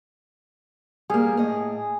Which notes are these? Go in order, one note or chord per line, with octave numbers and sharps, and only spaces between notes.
G3 A#3 G#4
A2 D#5